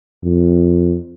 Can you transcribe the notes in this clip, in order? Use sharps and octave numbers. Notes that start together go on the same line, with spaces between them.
F2